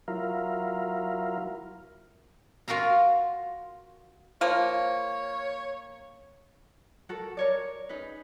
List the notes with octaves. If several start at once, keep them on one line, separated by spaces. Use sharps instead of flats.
F#3 E4 F4 A#4
F4 F#4 A#4 F5 A#5
F3 A#3 C#5
F#4 A4 A#4
A#4 C#5 D5
C#4 D#4 G#4 B4